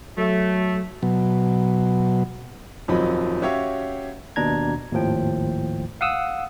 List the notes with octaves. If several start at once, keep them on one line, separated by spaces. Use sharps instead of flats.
F#3 A3
B2 F#3
D#1 F2 F3 F#3 D#4 B5
C#4 F#4 G4 C#5 E5 F5
D#2 B2 D4 A#5 G#6
G#1 D#2 A2 F3 G5
F5 F#5 D#6 E6